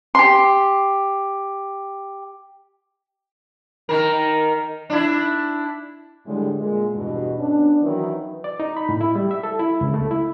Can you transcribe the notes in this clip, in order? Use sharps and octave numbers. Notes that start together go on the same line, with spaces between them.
G4 C6
D#3 A#4
D4 E4
A2 D3 G3 G#3
A#2 G#3
E2 G2 B2
B3 C#4 D4
D#3 E3 F#3 E4 B4
D5
D#4
B5
A2
E4
G3
E5
A4
E4
C#2
A3
E4